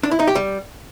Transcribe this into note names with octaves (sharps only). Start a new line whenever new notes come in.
D4
E4
D#4
G4
G3